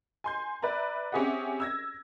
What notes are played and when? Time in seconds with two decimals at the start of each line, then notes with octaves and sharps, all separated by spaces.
0.24 G#5 C6 G6
0.62 B4 D5 E5 A#5
1.12 C4 C#4 G4 G#4 E5 F#5
1.60 E6 G#6 A#6